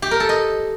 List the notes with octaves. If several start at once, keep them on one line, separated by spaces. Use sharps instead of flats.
G4
A#4
A4
D#5